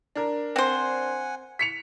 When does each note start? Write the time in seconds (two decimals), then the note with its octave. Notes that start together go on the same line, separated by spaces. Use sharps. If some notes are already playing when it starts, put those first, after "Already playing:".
0.16 D4 A#4
0.56 C4 C5 F#5 G#5
1.59 B6 C#7 F7